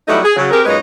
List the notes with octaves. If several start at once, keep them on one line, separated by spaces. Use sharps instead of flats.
F#3 G3 A3 B3 D#4 E4
G#4
C#3 F#3
C4 G4 G#4 A#4
F#2 A#2 G#3 D#4 B4 C#5